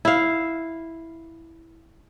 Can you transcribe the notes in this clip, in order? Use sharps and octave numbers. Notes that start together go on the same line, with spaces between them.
E4 F5